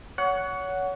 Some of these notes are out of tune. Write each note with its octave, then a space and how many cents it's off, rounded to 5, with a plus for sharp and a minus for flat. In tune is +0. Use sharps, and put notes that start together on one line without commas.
C#5 +30 F#5 +0